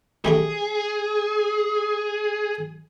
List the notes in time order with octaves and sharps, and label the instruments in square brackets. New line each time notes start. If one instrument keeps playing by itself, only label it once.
[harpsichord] G3 A3 D4 [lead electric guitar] G#4